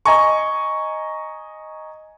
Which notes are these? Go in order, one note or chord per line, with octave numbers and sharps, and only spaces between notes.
D#5 G#5 A#5 C#6